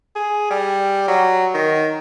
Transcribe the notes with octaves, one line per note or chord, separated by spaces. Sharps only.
G#4
G3
F#3
D#3